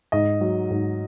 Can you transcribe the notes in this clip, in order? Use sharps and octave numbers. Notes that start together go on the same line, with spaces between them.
G#2 D#5
F#3
G#2